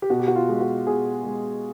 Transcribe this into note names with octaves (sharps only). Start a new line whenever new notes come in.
G4
B2 F#4
G4
F#4
F4
G#3
F#4
B2 G#4
G#3